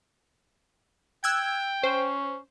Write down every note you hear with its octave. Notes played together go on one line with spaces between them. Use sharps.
G5 E6 F#6 G#6
C#4 C5